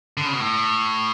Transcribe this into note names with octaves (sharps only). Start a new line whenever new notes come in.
D3
C#3
B2
A2